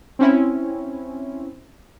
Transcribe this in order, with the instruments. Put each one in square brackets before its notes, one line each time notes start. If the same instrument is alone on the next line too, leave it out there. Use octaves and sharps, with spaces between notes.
[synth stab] C4 C#4 E4